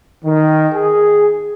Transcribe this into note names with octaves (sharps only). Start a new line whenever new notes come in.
D#3
G#4